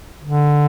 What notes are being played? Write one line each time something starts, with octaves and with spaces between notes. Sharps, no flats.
D3